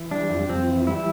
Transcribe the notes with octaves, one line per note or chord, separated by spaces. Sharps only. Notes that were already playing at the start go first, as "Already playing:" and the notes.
Already playing: E3
G3 D4
F2
F2 C4
E3
G3 E4